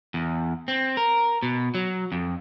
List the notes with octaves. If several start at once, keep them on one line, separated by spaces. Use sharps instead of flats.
E2
C4
A#4
B2
F#3
F2